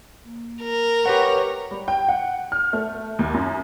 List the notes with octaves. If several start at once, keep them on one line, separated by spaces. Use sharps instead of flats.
A#3
A#4
G4 B4 C#5 F#5
G3
G5
F#5
F6
A3
D#2
F#2